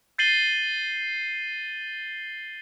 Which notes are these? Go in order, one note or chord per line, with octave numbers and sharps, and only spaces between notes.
G6 A6 C7 D#7 F#7 G7